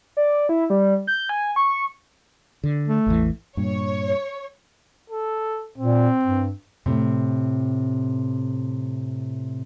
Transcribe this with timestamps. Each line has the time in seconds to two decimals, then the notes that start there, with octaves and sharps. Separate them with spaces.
0.17 D5
0.49 E4
0.70 G3
1.07 G6
1.29 G#5
1.56 C#6
2.64 D3
2.88 A3
3.06 A1 E2 E3
3.57 G2 A#2 C#5
5.10 A4
5.78 A#2 C4
6.25 G2
6.86 A2 C3